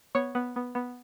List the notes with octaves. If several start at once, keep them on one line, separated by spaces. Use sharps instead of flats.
B3 C#5
B3
B3
B3